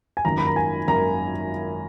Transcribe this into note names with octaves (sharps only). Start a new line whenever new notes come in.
G#5
G#1 F#2 D#3 A#3 A#5
B5
A#5
G#5
G#1 F#2 D#3 A#3 A#5